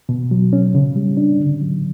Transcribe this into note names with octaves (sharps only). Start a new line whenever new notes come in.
B2
F#3
C#4
C#3
G3
D4
D3
F#3